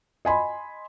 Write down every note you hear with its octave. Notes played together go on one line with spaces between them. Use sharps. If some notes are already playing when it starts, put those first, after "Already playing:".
D#5 G#5 B5 C6